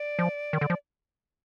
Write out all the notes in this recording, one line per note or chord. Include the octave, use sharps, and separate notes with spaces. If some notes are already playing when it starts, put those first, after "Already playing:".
Already playing: D5
F3
D#3
D3
F3